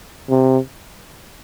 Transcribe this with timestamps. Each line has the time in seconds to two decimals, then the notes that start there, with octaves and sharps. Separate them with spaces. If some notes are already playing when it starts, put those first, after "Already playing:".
0.29 C3